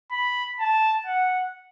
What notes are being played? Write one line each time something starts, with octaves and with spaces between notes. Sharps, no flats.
B5
A5
F#5